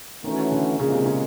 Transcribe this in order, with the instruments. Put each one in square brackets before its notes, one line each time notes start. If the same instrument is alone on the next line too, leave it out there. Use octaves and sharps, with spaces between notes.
[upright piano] D#3 [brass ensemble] E3 A3 C#4 F#4
[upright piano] D3
[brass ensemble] A#2 F3 G#3 [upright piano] C#3
[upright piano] C3
C#3